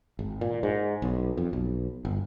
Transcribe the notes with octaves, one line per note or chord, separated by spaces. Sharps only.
G#1
A#2
G#2
B1
F2
B1
G1